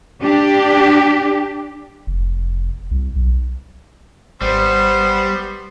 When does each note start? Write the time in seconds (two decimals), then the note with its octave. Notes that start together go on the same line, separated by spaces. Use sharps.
0.22 D4 G4
2.07 F1
2.91 C2
3.16 B1
4.41 G#1 G3 B3 C5